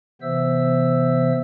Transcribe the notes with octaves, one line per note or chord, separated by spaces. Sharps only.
C3 E3 B3 C5 E5 E6